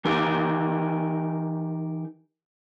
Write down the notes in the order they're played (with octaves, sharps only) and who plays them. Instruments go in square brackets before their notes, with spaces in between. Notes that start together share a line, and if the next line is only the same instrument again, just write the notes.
[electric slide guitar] E3 D#4 G4 A#4